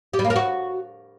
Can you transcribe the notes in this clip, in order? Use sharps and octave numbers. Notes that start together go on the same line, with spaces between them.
G4
G3
A#3
A#4
F#4